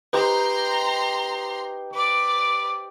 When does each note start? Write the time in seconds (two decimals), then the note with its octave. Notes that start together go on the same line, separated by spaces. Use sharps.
0.13 D#4 G4 B4 C5 A#5 C6
1.93 B4 D5 D6